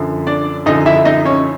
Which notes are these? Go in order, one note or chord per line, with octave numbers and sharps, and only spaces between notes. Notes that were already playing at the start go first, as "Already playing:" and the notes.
Already playing: F#2 D3 F3
D4 D5
F#2 D3 F3 D#4 D#5
E4 E5
D#4 D#5
C#4 C#5